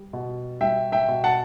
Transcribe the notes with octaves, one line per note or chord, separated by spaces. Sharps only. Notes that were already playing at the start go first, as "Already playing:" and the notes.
Already playing: G3
B2
G3 E5 G5
E5 G5
B2
F#5 A5